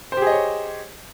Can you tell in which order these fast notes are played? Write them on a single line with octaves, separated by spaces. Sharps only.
C5 G4 G#4 D#5 C#5